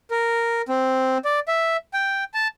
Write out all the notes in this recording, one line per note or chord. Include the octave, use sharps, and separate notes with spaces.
A#4
C4
D5
E5
G5
A5